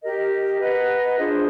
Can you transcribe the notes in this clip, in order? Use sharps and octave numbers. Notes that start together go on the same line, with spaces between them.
G4 A#4 D#5
B4 D#5 F#5 A#5
D4 F4 G#4 C5